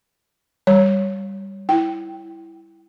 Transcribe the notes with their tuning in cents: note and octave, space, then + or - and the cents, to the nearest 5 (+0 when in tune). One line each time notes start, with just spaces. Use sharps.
G3 +0 C#5 +0
E4 +0 G5 -15